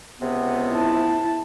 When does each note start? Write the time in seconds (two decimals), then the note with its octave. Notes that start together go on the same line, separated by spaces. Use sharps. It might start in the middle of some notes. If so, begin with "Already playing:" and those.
0.21 C#2 C3 B3
0.73 E4 A5